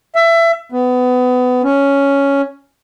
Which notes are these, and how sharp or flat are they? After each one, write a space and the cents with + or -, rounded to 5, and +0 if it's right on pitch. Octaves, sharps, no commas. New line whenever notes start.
E5 +25
B3 +25
C#4 +5